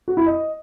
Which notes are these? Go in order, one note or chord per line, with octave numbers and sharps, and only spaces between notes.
F#4
E4
D#5